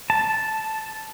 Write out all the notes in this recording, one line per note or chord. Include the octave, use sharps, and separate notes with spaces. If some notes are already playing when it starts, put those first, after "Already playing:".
A5